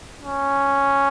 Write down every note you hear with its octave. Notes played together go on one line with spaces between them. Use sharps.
C#4